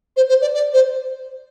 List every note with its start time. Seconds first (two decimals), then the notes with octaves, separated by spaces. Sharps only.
0.17 C5
0.29 C5
0.41 D5
0.54 D5
0.73 C5